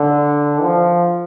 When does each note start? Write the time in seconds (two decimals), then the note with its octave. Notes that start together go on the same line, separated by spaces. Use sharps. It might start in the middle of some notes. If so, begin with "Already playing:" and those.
Already playing: D3
0.63 F3